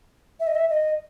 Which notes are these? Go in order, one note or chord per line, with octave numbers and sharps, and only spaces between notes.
E5
D#5
E5
D#5